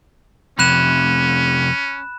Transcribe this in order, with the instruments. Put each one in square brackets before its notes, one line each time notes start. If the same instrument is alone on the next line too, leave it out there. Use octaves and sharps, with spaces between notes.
[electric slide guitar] F2 C3 [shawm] C#4 [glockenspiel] B5 F#6 E7